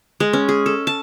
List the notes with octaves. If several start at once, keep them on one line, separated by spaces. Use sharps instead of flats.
G#3
C#4
G#4
A4
A5